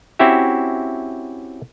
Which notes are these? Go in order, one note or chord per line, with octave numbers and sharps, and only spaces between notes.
C4 C#4 E4 F#4 G4 E5